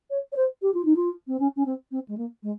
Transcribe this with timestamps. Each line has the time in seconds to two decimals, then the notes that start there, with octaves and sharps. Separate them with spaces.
0.11 C#5
0.32 C#5
0.36 C5
0.62 G4
0.74 F4
0.85 D#4
0.96 F4
1.28 C4
1.40 C#4
1.56 C#4
1.66 C4
1.92 C4
2.08 G#3
2.18 A#3
2.43 G#3